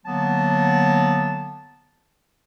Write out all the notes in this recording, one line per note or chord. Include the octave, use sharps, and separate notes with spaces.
D3 F#3 A#3 B3 A5